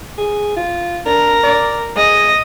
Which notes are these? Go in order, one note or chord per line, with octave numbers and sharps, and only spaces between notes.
G#4
F4
D4 A#4
D5
G#3 D#5